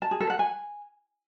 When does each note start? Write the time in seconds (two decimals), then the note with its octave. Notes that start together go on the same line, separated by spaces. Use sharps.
0.02 A5
0.11 G#4
0.20 A4
0.30 F#5
0.39 G#5